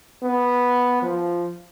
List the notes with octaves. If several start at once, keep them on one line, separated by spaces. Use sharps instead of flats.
B3
F3